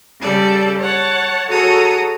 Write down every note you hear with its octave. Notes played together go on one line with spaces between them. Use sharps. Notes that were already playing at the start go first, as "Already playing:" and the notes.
C#3 G3 A4 D5
C#5 F#5 A5
F#4 G#4 A4 C#5 A#5 D#6